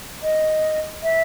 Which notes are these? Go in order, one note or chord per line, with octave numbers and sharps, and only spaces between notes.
D#5
E5